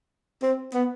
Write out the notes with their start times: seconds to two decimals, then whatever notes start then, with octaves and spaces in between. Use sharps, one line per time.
0.43 C4
0.74 B3